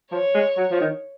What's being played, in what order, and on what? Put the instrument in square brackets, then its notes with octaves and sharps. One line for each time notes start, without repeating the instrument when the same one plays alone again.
[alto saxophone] F3 [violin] C#5
[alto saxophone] G#3
F#3
F3
D#3